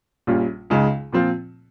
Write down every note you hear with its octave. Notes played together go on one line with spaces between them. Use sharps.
A#1 A#2 G3 C#4 F4
C#2 C#3 G#3 D#4
A#2 F3 C4 F4